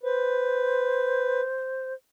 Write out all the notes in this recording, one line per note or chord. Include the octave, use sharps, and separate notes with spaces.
B4 C5